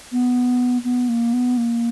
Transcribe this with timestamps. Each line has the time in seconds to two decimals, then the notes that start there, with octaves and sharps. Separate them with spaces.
0.12 B3
0.84 B3
1.09 A#3
1.33 B3
1.57 A#3